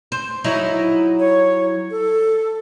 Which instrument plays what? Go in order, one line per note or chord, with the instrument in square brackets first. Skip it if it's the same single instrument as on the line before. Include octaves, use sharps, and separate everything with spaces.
[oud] C5
F#3 D#4 E4
[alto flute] C#5
A4